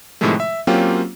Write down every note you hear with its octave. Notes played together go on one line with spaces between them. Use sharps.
A2 C3 D#3 F3 G#3 A3
E5
F#3 A#3 C4 C#4 F4 G4